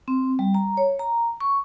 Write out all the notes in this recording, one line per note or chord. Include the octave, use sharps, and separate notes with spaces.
C4
G3
A#5
C#5
A#5
C#6